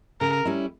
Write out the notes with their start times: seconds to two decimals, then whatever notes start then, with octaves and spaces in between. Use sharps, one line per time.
0.21 C#3 A#4
0.45 G3 C#4 E4